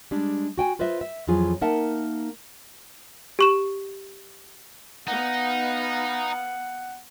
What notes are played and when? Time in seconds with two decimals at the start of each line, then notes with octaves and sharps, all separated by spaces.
0.11 G3 G#3 D4
0.58 F#4 G5 G#5
0.79 F4 B4 C5 D#5 E5
1.01 E5
1.27 F2 E3 F#3 F4 G#4
1.61 A#3 D#4 A#4 E5 F#5 A5
3.39 G4 C#6 E7
5.08 B3 D#4 F5 F#5